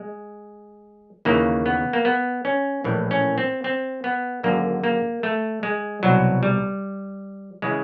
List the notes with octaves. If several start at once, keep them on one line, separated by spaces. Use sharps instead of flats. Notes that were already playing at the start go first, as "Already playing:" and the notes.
Already playing: G#3
D#2 C#3 E3 A#3
B3
A#3
B3
C#4
A#1 A2 E3
C#4
C4
C4
B3
G#1 F#2 D3 A#3
A#3
A3
G#3
C2 B2 F#3
G3
C#3 E3 G#3